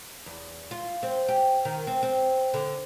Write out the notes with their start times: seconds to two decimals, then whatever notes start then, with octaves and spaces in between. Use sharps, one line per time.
0.26 E2
0.71 F4
1.03 C4
1.28 G4
1.65 D#3
1.87 C4
2.03 C4
2.54 D3